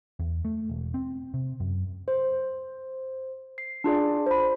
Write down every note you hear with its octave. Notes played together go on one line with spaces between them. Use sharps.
E2
A3
E1
C4
C3
F#2
C5
C7
D4 F4 G#4 D5
C5 B5